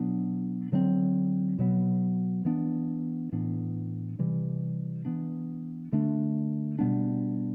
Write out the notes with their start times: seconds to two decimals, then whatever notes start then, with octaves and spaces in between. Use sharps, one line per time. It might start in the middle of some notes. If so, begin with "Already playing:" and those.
Already playing: B2 F#3 B3 D4
0.72 D3 F#3 A3 C4
1.59 B2 F#3 B3
2.45 E3 B3 D4
3.32 A2 E3 B3 D4
4.19 C3 E3 G3
5.05 E3 B3 D4
5.92 D3 A3 D4
6.79 B2 G3 B3 D4